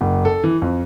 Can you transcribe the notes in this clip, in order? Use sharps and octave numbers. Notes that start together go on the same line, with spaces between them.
F#1
A4
E3
F2